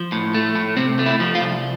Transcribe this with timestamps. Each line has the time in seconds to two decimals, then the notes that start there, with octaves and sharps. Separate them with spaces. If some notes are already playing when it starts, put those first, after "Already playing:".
Already playing: F3
0.12 A2
0.34 A3
0.55 A2
0.77 C3 C4
0.99 A3
1.06 E4
1.20 F3
1.35 F4
1.41 C2